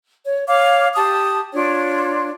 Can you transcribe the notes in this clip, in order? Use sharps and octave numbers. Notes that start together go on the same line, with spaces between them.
C#5
C#5 F5 D6
G4 A5 D#6
D4 F4 C#5